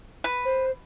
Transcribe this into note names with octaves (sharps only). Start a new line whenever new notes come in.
B4
C5